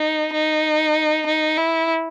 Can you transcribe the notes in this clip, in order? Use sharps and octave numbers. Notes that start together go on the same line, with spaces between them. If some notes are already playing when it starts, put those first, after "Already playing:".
Already playing: D#4
D#4
D#4
E4